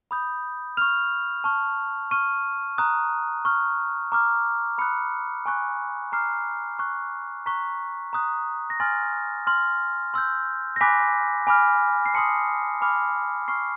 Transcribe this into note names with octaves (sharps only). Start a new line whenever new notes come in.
B5 D#6 G6
C#6 F6 F7
A5 C#6 F6
C#6 F6 D#7
A#5 D#6 F#6
C#6 F6
A#5 D6 F6
B5 D#6 F#6 C#7
G#5 C#6 F#6
A#5 D6 F6 C7
C#6 F#6
A#5 C#6 F#6 B6
A#5 D#6 F#6
A#6
G#5 C6 F6 A6
C6 F6
C6 E6 G6
A#6
G#5 B5 D6 F#6 B6
G#5 B5 D6 F6
C7
A5 C6 D#6 C#7
G#5 B5 D6 F6
C#6 F6 C7